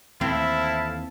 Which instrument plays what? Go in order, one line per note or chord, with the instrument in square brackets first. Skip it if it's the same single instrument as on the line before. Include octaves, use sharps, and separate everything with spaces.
[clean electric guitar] D#2 E3 [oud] C4 [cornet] E4 [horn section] A4 F5 A5